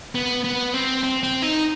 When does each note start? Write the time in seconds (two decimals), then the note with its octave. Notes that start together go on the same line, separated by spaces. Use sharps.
0.15 B3
0.44 B3
0.74 C4
1.04 C4
1.23 C4
1.42 D#4